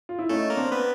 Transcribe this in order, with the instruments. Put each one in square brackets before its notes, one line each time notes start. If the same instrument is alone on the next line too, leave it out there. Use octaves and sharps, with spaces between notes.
[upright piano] F4
E4
[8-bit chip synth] A3 A4 [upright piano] C#4 D#4
[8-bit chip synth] A#3 A#4
[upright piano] C4 D4
[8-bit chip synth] B3 B4